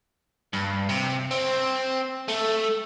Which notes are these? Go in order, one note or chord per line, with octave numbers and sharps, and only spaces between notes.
G2
C3
C4
A3